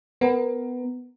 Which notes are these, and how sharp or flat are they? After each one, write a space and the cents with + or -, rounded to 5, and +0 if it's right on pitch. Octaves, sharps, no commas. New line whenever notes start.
B3 +15 A#4 +0